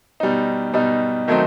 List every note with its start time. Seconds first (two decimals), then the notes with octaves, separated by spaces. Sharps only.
0.20 B2 G3 D#4
0.74 B2 G3 D#4
1.28 D#3 F#3 A3 C4 D#4